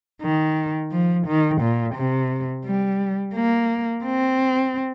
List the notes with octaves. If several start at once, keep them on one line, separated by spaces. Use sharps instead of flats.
D#3
F3
D#3
A#2
C3
G3
A#3
C4